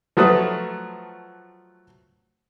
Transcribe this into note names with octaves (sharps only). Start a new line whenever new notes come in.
F3 F#3 A3 B4 D#6